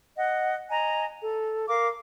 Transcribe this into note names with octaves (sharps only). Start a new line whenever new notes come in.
D#5 F#5
D#5 G#5 A#5
A4
A#4 F5 D6